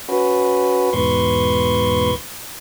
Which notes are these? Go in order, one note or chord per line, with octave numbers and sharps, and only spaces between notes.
C#4 F#4 B4
E2 G#2 B2 B4 C6 C#6